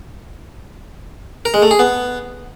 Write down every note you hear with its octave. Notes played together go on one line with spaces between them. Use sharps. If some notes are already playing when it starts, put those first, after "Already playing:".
A#4
G#3
A3
G#4
B3